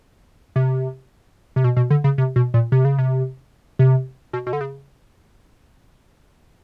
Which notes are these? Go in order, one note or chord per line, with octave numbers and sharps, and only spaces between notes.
C3
C3
B2
B2
D3
C#3
C3
B2
A#2
C3
C#3
C3
C3
B2
B2
D3
C#3